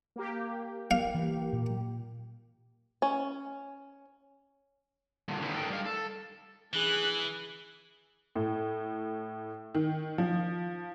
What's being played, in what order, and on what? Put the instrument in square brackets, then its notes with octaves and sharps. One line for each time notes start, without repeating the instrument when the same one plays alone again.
[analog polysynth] A#3 G4
[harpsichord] F5
[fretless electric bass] E3
A#2
[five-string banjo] C#4
[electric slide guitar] G2 A#2 D3
D3 D#3 G#3 A#3 C4 B4
D#4 A4 A#4 G5
G3 F5
A4
[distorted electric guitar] E3 [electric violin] G#4 F#6
[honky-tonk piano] A2
D#3
F3